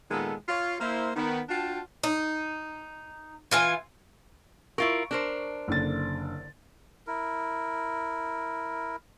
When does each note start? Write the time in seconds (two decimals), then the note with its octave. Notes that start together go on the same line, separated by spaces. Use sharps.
0.11 A#2 D#3 G#3 B3 A4
0.49 F4 C#5
0.80 A#3 E4 C5
1.16 D#3 B3
1.49 D4 F4 F#4 G5 A5
2.03 D#4
3.51 E3 F4 G#5
4.78 E4 F4 A#4 C#6
5.11 D4 A#4 C5
5.68 F#1 D3 A6
7.07 E4 A#4